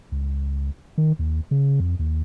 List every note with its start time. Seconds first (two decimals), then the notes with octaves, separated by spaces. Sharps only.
0.12 C#2
0.98 D#3
1.19 D#2
1.51 C#3
1.80 F2
1.99 D#2